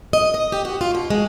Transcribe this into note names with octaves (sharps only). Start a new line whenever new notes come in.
D#5
D#5
G4
F#4
F4
B2
G#3